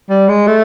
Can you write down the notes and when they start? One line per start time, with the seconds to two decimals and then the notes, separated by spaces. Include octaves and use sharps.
0.10 G3
0.29 G#3
0.47 A3